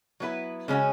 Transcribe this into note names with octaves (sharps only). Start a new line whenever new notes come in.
F#3 B3 E4 B4
C#3 G#3 C#4 F#4